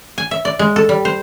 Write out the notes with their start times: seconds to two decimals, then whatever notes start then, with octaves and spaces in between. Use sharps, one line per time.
0.18 G#5
0.31 E5
0.45 D5
0.59 G#3
0.76 A4
0.89 G3
1.05 C5